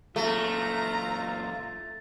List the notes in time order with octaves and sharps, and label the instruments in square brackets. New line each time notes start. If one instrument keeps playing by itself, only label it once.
[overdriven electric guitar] F#2 A#2 [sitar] A3 [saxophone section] F4 [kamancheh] A#5